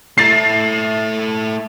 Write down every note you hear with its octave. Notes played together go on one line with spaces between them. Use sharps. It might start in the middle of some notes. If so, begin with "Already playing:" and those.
A3 E4 A6 C7